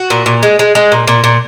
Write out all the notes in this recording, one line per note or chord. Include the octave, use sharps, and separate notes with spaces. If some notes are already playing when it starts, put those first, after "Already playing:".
Already playing: F#4
A#2
A#2
G#3
G#3
G#3
A#2
A#2
A#2